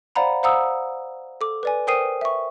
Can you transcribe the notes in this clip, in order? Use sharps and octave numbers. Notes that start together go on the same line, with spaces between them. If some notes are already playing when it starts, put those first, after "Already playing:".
C5 D5 F5 F#5 A#5 B5
C5 F5 F#5 A#5 D#6 E6
A4 D6
B4 D5 G#5
A#4 C5 G5 D#6 C7 D#7
E5 C#6